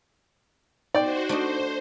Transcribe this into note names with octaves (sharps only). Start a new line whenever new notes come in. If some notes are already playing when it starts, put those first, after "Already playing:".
D#4 F#4 C5 D5 G5
A3 D4 C5 D#5